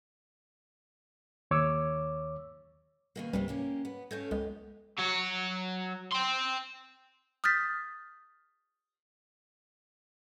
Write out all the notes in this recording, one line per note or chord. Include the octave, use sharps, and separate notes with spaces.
D#2 C#5 D6 E6
B2 D#3 A#3
C#2 C3 D#3 F3 G3 B4
A#3 C#4 G4
B3
A3 C#4 F4 G6 G#6 A#6
C#2 G#3 B3 G4
F#3 C#5
G5 C6
D#6 F6 G6 A6 B6